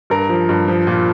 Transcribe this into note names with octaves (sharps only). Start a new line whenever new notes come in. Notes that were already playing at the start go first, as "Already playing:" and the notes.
G2 A#4
F3
G2
F3
A#2